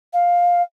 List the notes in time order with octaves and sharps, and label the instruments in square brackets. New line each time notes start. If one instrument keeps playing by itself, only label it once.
[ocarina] F5